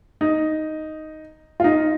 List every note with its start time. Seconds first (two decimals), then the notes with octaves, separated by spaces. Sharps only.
0.21 D#4
1.60 F4
1.64 D#4